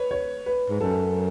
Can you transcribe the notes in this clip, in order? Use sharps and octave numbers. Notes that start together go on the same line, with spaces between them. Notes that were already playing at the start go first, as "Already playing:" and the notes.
Already playing: B4 C#5
C#5
B4
G#2
F#2 A4